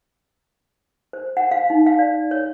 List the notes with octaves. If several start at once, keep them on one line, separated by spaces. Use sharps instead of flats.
C5
F#5
F5
D#4
F5
D5
C#5